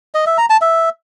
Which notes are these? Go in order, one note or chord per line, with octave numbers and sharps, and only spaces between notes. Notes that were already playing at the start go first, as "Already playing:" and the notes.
D#5
E5
A#5
A5
E5